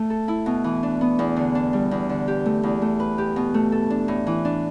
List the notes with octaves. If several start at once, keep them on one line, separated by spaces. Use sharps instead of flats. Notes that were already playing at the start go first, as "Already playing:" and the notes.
Already playing: A3
A4
E4
B2
E3
D4
B3
E2
D3
D4
G3
E2
D3
G4
A3
E2
A3
B4
G4
B2
A3
A4
D4
A2
E3
D4